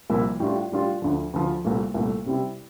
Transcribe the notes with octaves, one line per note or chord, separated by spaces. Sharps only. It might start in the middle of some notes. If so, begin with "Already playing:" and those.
C2 A#2 F3 A#3 E4
A2 G3 D4 F4
A2 G3 D4 F4
D2 D3 F3
D2 D3 F3
C2 A#2 A3
C2 A#2 A3
C3 G3 C4 E4